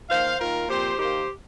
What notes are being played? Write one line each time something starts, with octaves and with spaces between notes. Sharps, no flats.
D#3 A#3 C5 F5
D#3 A#3 F4 A#4
A#2 F3 C4 G4 C5
D#3 A#3 G4 C5